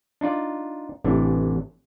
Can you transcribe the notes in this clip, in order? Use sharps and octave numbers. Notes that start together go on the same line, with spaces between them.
D4 D#4 F4 D5
A1 C3 E3 D4